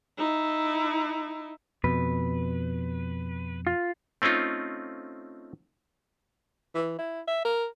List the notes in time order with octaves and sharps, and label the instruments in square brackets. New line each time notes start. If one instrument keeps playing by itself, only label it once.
[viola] D#4 E4
[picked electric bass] F2 B2 [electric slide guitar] B4
[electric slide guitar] F4
[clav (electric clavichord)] A3 C4 C#4 D#4 F4
[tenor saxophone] E3
E4
E5
A#4